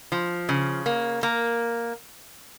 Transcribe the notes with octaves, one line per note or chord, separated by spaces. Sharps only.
F3
C#3
A#3
A#3